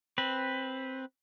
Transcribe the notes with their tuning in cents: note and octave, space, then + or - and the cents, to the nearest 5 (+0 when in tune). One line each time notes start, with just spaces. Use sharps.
C4 +10 B4 +0